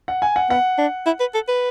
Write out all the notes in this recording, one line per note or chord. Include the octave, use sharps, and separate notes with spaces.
F#5
G#5
F#5
B3 F#5
D4
E4
B4
A4
B4